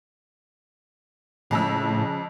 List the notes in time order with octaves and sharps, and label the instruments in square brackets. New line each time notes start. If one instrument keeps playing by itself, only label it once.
[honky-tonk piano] F2 G#3 E6 [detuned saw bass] A2 [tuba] C#3